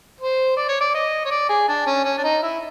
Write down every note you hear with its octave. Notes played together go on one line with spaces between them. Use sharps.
C5
D5
C#5
D5
D#5
C#5
D5
G#4
D4
C#4
C#4
D4
D#4
E4